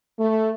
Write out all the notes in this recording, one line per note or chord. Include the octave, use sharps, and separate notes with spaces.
A3